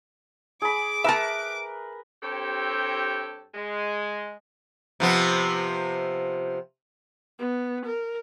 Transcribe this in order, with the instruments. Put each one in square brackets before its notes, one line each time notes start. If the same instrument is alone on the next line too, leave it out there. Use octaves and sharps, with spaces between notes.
[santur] G#4 B5 [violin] D6
[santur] A#4 B4 [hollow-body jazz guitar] E5 A5
[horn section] G2 C4 G4 A4 C#5 G5
G#3
[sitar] C3 F3 B3
[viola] B3
A#4